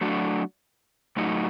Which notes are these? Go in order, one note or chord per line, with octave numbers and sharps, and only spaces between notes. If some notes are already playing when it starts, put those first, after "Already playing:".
F#3 A3 D4 F#4
A2 F#3 A3 D#4 F#4